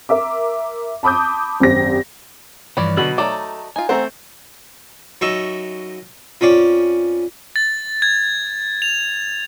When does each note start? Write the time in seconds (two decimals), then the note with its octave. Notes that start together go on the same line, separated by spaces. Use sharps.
0.09 A#4 E5 D6
1.03 A5 B5 D6 D#6 G6
1.60 G#1 F#2 C4 G4 A#6
2.77 G2 E3 F3 B4 C#5 D5
2.97 B2 D3 F#3 B5
3.18 F#3 A3 D#4 A4 D5
3.76 D#4 F4 G#5
3.89 A3 C4 C5 F#5 A#5
5.21 F#2 D#4 E5 C#6
6.41 F2 C#4 D5 C#6
7.56 A6
8.02 G#6
8.82 F7